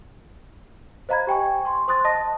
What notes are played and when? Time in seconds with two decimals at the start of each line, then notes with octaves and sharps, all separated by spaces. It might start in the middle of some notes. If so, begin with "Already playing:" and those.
1.09 C5 D#5 F5 A#5 B5 G#6
1.27 G4 G5 G#5 C#6
1.65 C6 C#6
1.88 C5 C6 D#6 F#6 A6
2.05 D#5 A5 D#6 A#6